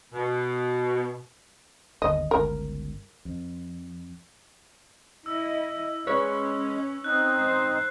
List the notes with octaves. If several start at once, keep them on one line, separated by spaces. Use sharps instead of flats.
B2
G1 D#2 D3 D#5
G1 C#2 A#4
F2
E4 D#5 E6
G#3 C#4 B4 C#5
C4 D#4 F#6
C5